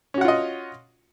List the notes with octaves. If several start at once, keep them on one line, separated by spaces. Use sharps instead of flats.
C#4 F4 F#4 D#5 F#5